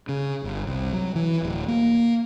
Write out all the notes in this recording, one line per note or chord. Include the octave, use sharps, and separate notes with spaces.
C#3
G1
C2
F#3
E3
D1
A#3